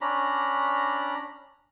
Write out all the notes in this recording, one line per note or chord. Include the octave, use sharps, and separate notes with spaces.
C#4 D4 A#5 B5